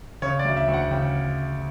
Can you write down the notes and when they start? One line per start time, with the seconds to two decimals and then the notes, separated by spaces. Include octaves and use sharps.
0.22 C#3 C#5
0.39 D5
0.45 D2
0.57 E5
0.68 D2
0.73 F#5
0.91 C#3 G5